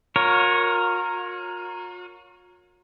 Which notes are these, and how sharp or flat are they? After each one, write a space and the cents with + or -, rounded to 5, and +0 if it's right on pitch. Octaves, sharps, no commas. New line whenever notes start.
F4 +45 A#4 +0 C#5 +0